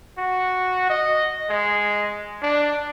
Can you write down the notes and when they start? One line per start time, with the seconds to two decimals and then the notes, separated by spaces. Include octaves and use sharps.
0.17 F#4
0.90 D#5
1.49 G#3
2.42 D4